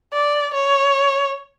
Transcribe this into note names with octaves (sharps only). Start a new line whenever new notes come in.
D5
C#5